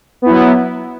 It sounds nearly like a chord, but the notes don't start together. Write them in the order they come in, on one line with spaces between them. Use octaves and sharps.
B3 E4 F#3